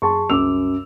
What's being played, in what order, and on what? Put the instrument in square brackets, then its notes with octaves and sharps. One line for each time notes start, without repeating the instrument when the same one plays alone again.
[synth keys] F#2 G#4 C6 [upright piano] A5 C#6
[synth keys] C2 D6 [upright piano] F#2 E6 F7